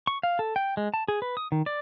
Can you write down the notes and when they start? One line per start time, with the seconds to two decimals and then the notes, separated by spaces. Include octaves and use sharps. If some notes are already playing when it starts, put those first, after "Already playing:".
0.07 C#6
0.23 F5
0.39 A4
0.56 G5
0.77 G#3
0.94 A5
1.08 G#4
1.22 B4
1.37 D#6
1.52 D#3
1.66 D5